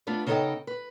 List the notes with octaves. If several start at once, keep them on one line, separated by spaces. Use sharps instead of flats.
A3 B3 D4 F4 B4
C#3 B3 D#4 A4 D#5 G5
B4